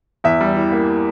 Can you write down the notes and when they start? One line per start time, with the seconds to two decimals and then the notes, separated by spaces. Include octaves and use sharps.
0.24 E2 E5
0.41 G3
0.56 E3
0.72 A#3